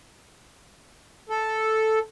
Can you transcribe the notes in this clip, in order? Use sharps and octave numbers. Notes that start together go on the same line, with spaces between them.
A4